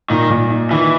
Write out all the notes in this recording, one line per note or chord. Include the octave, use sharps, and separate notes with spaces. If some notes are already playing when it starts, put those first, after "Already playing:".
A#2 D#3
A#2
D#4
D#3 E3